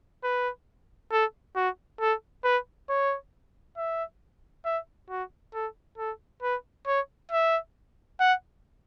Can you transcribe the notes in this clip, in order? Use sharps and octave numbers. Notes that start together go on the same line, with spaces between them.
B4
A4
F#4
A4
B4
C#5
E5
E5
F#4
A4
A4
B4
C#5
E5
F#5